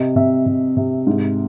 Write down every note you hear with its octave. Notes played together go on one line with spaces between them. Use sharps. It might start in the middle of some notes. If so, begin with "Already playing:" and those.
Already playing: C3 D#5
C3 E5
C3
C3
G#2